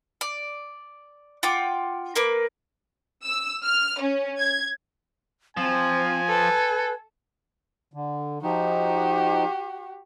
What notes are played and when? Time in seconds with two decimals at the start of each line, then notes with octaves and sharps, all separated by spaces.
0.21 D5
1.43 F4 F#5 G5 D6
2.15 A#3 A#4 B4 D6
3.24 E6
3.63 F6
4.00 C#4
4.39 G#6
5.57 F3 C4 G#5
6.28 A4 B4
7.94 D3
8.43 F3 D#4 F#4 G4